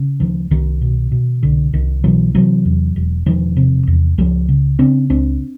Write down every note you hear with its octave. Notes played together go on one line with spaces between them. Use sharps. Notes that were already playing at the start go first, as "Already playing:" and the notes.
Already playing: C#3
D2 D#3 F3
C2 D#3
B2
B2
C2 D3
C2 D#3
B2 E3 F#3
C3 E3 F#3
E2
E1
E1 D#3 F3
C3
E2
C#2 F3 G3
C#3
C#3 C4 D4
C#2 C4 D4